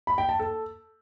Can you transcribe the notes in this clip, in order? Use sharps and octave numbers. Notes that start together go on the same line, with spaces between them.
B5
G5
A5
A4